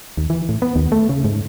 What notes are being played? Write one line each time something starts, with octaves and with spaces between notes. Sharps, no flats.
D#2
E3
A2
B3
D#2
A3
C#3
G#2